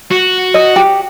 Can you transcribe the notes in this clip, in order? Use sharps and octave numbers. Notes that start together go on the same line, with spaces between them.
F#4
D#5
G4